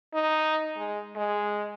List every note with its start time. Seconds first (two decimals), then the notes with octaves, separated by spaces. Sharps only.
0.14 D#4
0.77 G#3
1.16 G#3